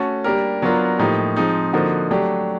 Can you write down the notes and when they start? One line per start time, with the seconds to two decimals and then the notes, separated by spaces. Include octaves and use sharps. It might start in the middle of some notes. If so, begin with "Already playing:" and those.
Already playing: A3 C#4 F#4 A4
0.24 G3 A#3 D4 G4 A#4
0.62 F#3 B3 D4 F4 A#4
0.99 A2 F3 A#3 D#4 G4
1.36 F3 G#3 C4 D#4
1.73 D3 F3 A#3 D#4 F#4
2.11 F#3 A3 D4 G4